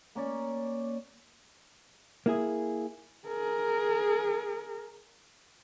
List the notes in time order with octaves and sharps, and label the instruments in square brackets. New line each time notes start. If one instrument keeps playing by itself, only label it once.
[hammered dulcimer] A#3 C#4 D5
[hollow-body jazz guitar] A#3 E4 G#4
[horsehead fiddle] G#4 A#4